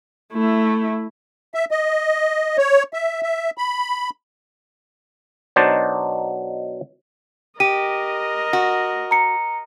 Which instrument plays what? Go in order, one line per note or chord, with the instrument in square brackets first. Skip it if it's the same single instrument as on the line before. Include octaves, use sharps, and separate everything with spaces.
[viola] A3 E4
[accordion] E5
D#5
C#5
E5
E5
B5
[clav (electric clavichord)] B2 F#3 D4 D#4 C5 A5
[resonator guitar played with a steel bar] G4 [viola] A#4 D#5 [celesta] D#7
[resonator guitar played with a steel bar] F#4
[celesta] A#5 C#7